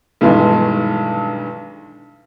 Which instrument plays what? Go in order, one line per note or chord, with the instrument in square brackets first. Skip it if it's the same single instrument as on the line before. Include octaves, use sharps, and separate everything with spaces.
[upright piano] B1 G2 D#3 E3 G#3